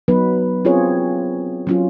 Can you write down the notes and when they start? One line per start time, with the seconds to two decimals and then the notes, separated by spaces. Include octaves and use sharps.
0.08 F#3 B3 D#4 B4
0.65 C4 C#4 F4 G#4 C#5
1.67 F#3 C#4 F4